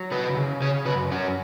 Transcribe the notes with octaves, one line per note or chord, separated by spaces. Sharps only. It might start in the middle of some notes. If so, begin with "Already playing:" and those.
Already playing: F#3
C#3 F#4 B4
C#3
C#3 G#4 C#5
F#2 F#4 B4
F#2 C#4 F#4